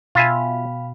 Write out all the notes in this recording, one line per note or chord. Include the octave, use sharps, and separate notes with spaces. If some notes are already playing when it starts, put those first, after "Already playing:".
B2 F4 E5 F5 G5 G#5 B5